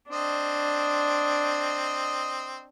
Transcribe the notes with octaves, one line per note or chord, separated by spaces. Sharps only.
C4 D4 D#5